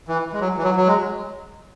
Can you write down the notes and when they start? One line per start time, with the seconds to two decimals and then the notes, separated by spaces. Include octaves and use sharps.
0.08 E3
0.33 G#3
0.41 F#3
0.57 E3
0.63 F#3
0.76 F#3
0.87 G#3